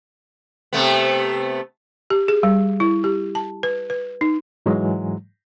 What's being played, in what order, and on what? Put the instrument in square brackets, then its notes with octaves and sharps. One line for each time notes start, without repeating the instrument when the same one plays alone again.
[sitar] C3 A3 B3
[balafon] G4
G#4
G3
E4
G4
A5
B4
B4
D#4
[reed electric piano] G#2 E3 F#3 G#3